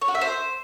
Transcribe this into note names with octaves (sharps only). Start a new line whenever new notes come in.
C#5
F#4
E5
C5